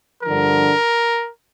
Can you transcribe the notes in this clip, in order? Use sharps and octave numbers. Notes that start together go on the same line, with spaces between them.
G2 D3 F3 A#4